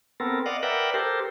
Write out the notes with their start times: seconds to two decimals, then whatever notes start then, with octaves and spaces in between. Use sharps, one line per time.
0.20 B3 C4 A4 A#4
0.46 D5 D#5 F5 F#5
0.63 A#4 B4 D5 E5 F#5 G5
0.94 G4 A4 A#4 C5